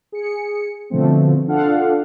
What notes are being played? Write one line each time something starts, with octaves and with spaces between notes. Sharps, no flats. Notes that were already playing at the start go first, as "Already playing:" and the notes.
G#4 C#7
B2 D3 F3 A3 C4
D4 F4 A4 F5 F#5